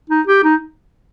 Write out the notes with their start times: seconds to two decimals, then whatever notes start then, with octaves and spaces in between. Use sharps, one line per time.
0.10 D#4
0.27 G4
0.44 D#4